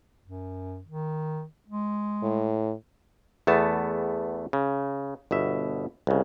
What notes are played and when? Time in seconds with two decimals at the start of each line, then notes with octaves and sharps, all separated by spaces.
0.25 F#2
0.87 D#3
1.68 G#3
2.23 A2
3.47 E2 A3 B3 A5
4.53 C#3
5.31 G1 B2 E5
6.07 C2 C#3